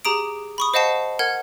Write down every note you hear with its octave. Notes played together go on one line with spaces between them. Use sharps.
G4 G#4 A#5 D#6 D7
B5 C#6 D#6
C5 D#5 F5 F#5 A5 C7
A#4 F#5 F6 G#6